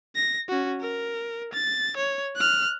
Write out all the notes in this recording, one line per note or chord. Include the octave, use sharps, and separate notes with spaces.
A#6
C#4 F#4
A#4
A6
C#5
F6 F#6